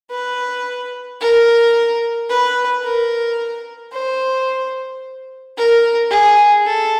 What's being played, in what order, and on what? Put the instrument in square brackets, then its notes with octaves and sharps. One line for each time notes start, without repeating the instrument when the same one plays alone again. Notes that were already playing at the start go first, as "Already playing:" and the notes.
[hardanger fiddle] B4
A#4
B4
A#4
C5
A#4
G#4
A4